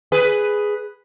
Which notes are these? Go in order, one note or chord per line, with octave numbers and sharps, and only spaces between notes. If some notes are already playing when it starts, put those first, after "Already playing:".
G#4 B4